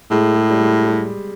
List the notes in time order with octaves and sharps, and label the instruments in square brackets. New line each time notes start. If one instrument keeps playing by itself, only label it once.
[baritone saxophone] A2 [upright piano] G#3
[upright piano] G#3
G3
G#3
G3